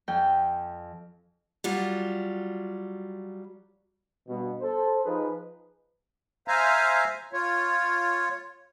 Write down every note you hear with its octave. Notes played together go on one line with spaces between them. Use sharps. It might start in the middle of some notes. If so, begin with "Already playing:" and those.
F2 G5 G#5
F#3 G3 F4
G2 B2
A4 C5
F3 D#4 G#4 B4
C5 E5 F5 G#5 A#5
F4 C#5